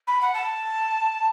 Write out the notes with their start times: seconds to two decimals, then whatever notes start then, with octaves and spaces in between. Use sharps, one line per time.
0.07 B5
0.20 F#5
0.33 A5